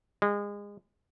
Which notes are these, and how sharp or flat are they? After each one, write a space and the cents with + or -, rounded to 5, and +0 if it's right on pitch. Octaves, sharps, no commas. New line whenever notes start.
G#3 -30